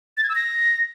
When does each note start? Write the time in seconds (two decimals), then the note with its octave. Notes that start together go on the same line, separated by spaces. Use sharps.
0.17 A6
0.23 G#6
0.29 E6
0.35 A#6